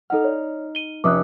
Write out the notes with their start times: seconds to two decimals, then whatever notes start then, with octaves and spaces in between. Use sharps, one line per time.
0.10 D#4 A4 D#5 F#5 F6
0.24 C#5 D5
0.75 D#7 G7
1.04 F1 C#4 E5 D6 D#6 F#6